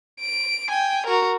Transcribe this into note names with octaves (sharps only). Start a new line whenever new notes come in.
D7
G5 G#5
F#4 A#4